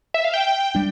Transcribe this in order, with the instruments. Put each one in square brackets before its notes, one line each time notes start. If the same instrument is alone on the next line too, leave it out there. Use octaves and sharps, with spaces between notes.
[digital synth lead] E5
F5
G5
[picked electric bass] G3 D4